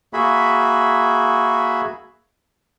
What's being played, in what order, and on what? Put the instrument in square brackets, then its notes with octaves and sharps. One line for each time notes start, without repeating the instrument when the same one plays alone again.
[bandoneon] A#3 F#4 G#4 E5 B5